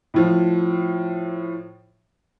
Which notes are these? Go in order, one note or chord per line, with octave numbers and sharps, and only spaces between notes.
A2 F3